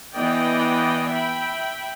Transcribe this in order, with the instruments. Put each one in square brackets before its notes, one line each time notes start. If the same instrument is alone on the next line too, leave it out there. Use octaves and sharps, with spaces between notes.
[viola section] E3 B3 D5 D#5 G5
E5 G5 B5